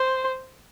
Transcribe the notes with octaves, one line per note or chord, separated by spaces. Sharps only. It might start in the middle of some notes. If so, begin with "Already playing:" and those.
Already playing: C5